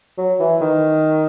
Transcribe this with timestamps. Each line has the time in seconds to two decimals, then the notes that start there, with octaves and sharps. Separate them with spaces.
0.18 F#3
0.40 E3
0.61 D#3